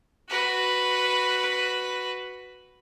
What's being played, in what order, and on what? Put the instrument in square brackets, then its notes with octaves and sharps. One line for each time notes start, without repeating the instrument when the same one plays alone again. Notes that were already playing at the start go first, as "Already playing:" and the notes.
[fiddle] F#4 B4